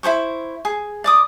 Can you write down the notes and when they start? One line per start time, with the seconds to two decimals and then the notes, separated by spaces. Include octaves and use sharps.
0.03 E4 G#4 C5 C#6
0.65 G#4
1.04 D5 D6 D#6